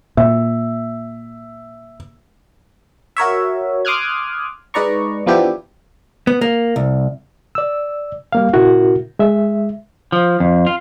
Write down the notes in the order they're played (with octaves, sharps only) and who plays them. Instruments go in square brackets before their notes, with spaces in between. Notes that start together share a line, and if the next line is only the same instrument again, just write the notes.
[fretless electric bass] A#2 [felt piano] E5
[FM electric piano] F#4 A#4 C#5 E5
C6 D6 D#6 F6 F#6 G#6
G#3 D#4 B4 D5 A#5 C#6
E3 F3 B3 D4 E4 G4
[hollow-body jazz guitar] B3
A#3
C2
[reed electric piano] D5 E6
G3 A#3 F5
A#2 C#3 E4 F#4 A#4
G#3 E5
[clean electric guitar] F3
F2
F4